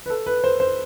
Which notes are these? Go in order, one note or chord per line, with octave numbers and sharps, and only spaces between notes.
B4
A4
B4
C5
C5